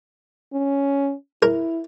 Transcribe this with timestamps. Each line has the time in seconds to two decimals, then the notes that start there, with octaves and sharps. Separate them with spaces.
0.53 C#4
1.43 E4 A#4